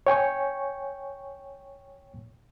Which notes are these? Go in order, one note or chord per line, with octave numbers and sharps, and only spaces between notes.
C#5 G5 G#5 C#6